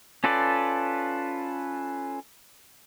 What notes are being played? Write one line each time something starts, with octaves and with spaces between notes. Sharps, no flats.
C#4 F4 A4 B4 D5